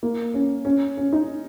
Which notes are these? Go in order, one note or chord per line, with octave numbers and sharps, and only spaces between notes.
A#3
C#4
C#4
C#4
D#4